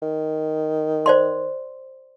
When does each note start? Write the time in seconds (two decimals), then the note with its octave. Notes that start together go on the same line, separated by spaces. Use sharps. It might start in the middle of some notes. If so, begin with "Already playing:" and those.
0.02 D#3
1.06 C5 D5 C6